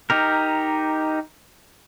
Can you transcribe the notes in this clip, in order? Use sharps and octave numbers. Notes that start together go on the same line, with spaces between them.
D#4 G4 A#4